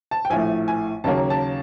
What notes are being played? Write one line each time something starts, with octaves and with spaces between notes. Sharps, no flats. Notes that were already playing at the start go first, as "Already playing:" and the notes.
A5
G5
A#1 A2 F3 A3 G#5
G#5
D#2 C#3 F#3 A#3 A5
A5